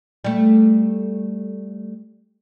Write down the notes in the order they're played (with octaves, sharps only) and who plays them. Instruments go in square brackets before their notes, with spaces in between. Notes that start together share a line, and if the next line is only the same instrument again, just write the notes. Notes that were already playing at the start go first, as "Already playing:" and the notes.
[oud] G3 A3